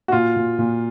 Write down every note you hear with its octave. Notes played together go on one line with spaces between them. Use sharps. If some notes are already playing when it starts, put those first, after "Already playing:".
F#4
A#2 F4
A#2
A#2